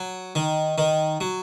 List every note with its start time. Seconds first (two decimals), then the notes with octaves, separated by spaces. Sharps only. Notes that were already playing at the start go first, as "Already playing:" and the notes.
Already playing: F#3
0.35 D#3
0.78 D#3
1.21 F#3